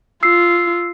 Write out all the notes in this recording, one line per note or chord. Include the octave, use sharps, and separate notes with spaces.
F4 E6 C7